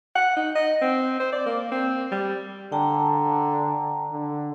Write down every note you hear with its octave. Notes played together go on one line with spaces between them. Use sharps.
F#5
D#4
D#5
C4
C5
D5
A#3
C4
G3
D3 G5 A5 A#5
D3